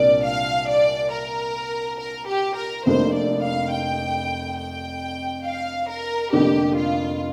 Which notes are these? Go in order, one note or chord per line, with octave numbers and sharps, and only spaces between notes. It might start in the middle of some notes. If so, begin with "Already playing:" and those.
Already playing: C2 A#2 A#3 D4 D5
F5
D5
A#4
A#4
G4
A#4
F1 F2 C3 A#3 D4 C5
D5
F5
G5
G5
F5
A#4
F1 F2 D3 A#3 D4 G4
F4